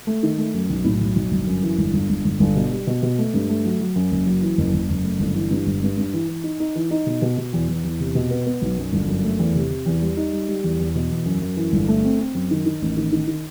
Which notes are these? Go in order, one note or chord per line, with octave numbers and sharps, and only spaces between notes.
A3
D#3
A3
F#2
B1
A2
B1
B1
G1
F#2
E3
G1
G1
G1
G1
G1
B2
G3
B2
B2
A3
G2
A3
F#3
F#3
F#2
F#1
F#3
E3
F#1
F#1
F#1
A3
G1
E3
G2
G1
G2
G2
E3
E3
D#4
D#4
E3
D#4
B2
B2
B2
E2
E2
E2
C3
B2
B3
B3
B1
F#2
G1
F#2
A3
E2
C3
C3
E2
G3
D#4
G3
G3
E2
E2
B2
E2
F#2
F#2
E3
G1
A3
C4
C4
F#2
D#3
D#3
A1
D#3
D#3
D#3